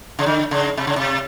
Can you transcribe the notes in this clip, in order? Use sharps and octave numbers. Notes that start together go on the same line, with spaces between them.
C#3
D3
C#3
C3
C#3
C3